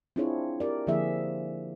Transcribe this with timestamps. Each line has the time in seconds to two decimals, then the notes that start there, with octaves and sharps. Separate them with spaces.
0.16 C4 D4 E4 F4 G#4 C#5
0.60 G4 A#4 D5
0.87 D3 F3 A#3 E4 G#4 E5